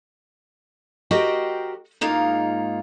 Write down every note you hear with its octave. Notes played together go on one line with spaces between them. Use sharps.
F#4 G4 A#4 C5 D#5 G5
G#2 G#3 A#3 D#4 F4